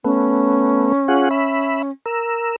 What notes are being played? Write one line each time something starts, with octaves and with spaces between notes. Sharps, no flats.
A3 B3 C#4
F4 G#4 F#5
E5 B5
A#4 E6